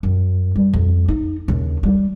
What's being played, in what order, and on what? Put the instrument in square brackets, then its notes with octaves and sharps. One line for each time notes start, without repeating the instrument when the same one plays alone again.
[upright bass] F#2
G3
F2
D#4
D#2 C#3
G3